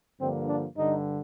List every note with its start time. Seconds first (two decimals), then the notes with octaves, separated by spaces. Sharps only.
0.20 G2 D3 F3 A#3 C4
0.48 D4
0.76 G2 D3 G3 D#4